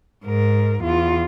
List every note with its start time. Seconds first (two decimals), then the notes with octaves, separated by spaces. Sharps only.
0.25 G#2 A#4
0.83 E2 F4